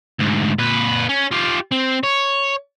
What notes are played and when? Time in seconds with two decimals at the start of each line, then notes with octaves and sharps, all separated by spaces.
0.19 D2 G#2
0.58 A#2 B4
1.09 C#4
1.31 F4 G4
1.72 C4
2.03 C#5